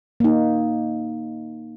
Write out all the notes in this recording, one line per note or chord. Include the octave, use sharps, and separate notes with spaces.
A#3 D#4